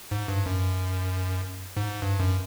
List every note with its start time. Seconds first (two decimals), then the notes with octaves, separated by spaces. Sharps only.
0.11 G#2
0.28 G2
0.46 F#2
1.77 G#2
2.02 G2
2.20 F#2